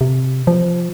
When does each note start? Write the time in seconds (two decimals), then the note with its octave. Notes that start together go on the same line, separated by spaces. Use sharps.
0.01 C3
0.47 F3